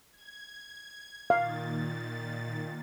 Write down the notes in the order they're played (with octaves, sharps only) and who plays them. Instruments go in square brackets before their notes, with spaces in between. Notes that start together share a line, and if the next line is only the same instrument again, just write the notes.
[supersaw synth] G#6
[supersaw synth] A#2 D#3 A6 [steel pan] F5